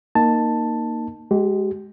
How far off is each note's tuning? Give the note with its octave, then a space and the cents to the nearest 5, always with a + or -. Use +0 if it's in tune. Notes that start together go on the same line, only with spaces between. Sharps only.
A#3 +0 D#4 -10 A5 +5
G#3 +0 G4 -40